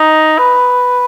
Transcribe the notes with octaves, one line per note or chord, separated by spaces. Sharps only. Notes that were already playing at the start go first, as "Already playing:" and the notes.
Already playing: D#4
B4